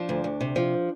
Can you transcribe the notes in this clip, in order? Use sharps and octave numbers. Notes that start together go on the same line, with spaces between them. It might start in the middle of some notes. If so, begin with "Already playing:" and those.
Already playing: F3 D4
D2
D2
C3
F3